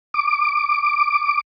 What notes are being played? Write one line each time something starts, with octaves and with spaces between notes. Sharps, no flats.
D6